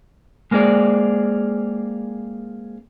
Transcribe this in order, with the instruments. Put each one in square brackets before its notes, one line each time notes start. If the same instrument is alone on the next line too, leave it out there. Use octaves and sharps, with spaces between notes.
[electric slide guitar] G#3 A#3 C4 G#4 D5